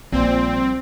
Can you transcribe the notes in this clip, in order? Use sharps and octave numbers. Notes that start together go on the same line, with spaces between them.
A#1 A#2 G3 C4